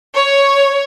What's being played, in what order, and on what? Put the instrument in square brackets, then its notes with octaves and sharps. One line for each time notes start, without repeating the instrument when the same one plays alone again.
[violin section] C#5